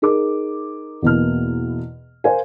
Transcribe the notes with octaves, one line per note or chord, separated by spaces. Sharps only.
D#4 G#4 A#4 D6
E2 B2 A#3 F6
A#4 C5 F5 G#5